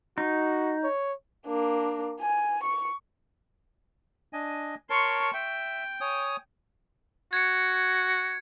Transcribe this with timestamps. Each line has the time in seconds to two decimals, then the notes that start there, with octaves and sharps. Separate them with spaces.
0.18 D#4 F#4
0.83 C#5
1.46 A#3 D4
2.21 G#5
2.63 C#6
4.33 D4 D#5 G#5
4.90 A#4 C#5 A5 C6 C#6
5.33 E5 G5
6.01 C#5 G#5 D#6
7.33 F#4 G#6 C#7